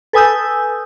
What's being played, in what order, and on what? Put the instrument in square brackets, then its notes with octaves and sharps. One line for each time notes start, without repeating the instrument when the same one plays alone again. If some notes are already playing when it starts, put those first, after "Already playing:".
[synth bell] A4 B4 G#5 D#6 E6 G6